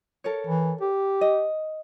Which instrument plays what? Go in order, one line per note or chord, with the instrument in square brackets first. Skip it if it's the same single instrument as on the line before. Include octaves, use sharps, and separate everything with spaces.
[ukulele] A4 A#4 C#5
[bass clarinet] E3
G4
[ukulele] D#5